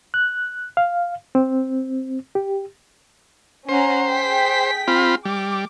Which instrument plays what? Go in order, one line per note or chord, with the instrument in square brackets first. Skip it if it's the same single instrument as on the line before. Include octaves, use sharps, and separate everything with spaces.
[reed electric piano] F#6
F5
C4
G4
[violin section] C#4 F#5 A#5 [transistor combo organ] C5
[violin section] G#4 G5 B6
[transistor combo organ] C4 F4 B5
[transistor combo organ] G3 [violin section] D6